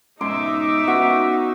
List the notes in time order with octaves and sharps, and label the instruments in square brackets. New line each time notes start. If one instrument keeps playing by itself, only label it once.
[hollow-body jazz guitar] G#2 B2 C#4 [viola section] D#4 E5 [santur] C6 [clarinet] D6
[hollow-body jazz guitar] B3 C#4 [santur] F#4